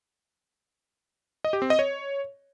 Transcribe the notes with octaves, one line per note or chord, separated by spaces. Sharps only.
D#5
G4
C4
D#5
C#5